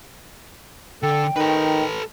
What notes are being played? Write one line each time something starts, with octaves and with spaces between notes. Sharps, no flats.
D3 A4 G5
D#3 D#4 A4 B4